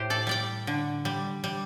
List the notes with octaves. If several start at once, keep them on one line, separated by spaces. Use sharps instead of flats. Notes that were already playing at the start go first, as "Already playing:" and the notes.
Already playing: A2 G4 C5
A4 D5
G3 D5 G5
D3
G3
G3